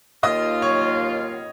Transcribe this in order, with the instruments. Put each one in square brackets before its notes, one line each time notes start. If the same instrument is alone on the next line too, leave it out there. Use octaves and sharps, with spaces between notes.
[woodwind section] D#2 D#3 A#3 F4 [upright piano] D#5 D#6
[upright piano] C#5 C#6